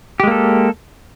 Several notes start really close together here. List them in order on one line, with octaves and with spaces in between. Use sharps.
G4 G#3 A#3 A4